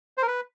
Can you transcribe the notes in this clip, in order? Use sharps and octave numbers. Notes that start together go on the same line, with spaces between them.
C5
A#4
B4